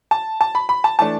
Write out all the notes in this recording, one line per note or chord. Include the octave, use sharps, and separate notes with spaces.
A5
A5
B5
B5
A5
E3 A3 D4 A5